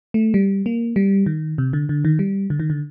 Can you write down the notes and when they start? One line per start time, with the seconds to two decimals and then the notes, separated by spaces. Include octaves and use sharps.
0.14 A3
0.34 G3
0.66 A#3
0.96 G3
1.26 D#3
1.58 C3
1.73 D3
1.89 D3
2.05 D#3
2.19 G3
2.50 D3
2.60 D#3
2.70 D3